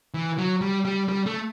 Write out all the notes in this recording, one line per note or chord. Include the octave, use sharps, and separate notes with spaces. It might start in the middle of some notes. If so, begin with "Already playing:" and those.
E3
F#3
G3
G3
G3
A3